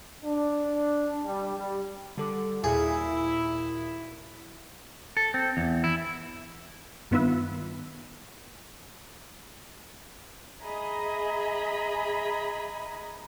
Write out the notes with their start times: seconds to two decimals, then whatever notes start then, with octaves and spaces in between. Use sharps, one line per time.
0.25 D4
1.24 G3
1.58 G3
2.18 D3 G3 A4 D6
2.64 D#2 A#2 E4 F#4 G#4 D#6
5.17 A4
5.34 C4
5.57 E2
5.84 E4
7.11 G2 D#3 B3 F4 B4 E5
10.63 G#4 D#5 E5 A#5 B5 G#6